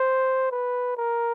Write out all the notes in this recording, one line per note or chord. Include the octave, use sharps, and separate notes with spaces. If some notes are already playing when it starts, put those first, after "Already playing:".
Already playing: C5
B4
A#4